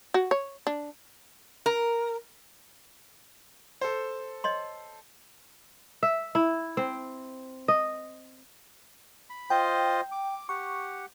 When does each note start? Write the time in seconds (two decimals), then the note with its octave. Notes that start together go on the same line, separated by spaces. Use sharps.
0.14 F#4
0.31 C#5
0.67 D4
1.66 A#4
3.81 A4 C5
4.44 C#5 D#5 C6
6.03 E5
6.35 E4
6.77 C4
7.68 D#5
9.30 B5
9.50 F4 C5 D#5 G5
10.12 D6
10.49 G4 F#5 C#6